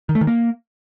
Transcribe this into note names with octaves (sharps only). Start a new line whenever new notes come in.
D#3
A3
D#3
A#3